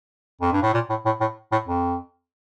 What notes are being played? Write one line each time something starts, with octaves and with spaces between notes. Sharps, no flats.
F2
G2
A2
A#2
A2
A2
A2
A2
F2